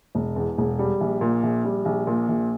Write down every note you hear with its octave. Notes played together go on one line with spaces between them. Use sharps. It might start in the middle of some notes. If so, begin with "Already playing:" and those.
E1
E2
E1
G3
A#1
A#2
A#1
G3
A#1
A#2
A#1